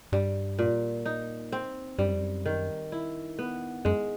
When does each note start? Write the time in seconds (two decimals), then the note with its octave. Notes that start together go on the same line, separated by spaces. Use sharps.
0.12 G2 G3
0.59 A#2
1.06 D#4
1.52 C4
1.99 G2 G3
2.06 F#2
2.14 F2
2.20 F#2
2.46 D#3
2.92 E4
3.39 B3
3.85 F#2 G#3